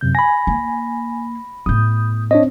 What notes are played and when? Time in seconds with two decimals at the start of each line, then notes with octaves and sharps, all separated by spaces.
0.01 F#2 C3 G6
0.15 G#5 B5 A#6
0.47 A#3
1.66 A2 B3 D#6 G6
2.31 C4 D4 C#5 D#5